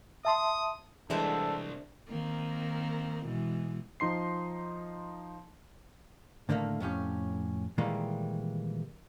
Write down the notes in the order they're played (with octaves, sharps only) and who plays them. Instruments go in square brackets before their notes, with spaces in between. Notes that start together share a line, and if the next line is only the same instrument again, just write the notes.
[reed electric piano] E5 A5 C6 [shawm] D#6
[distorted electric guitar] C2 [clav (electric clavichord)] E3 G3 G#3 [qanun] D4 C5 E5 [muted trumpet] A4
[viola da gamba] D#3 A#3 C4
B2 E3 G#3
[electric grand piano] F3 D#4 C6 C7
[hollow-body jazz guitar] A2 D3 D#3 A3 A#3
F2 A2 C#4 G4
A#2 D#3 E3 G3 G#3 A#3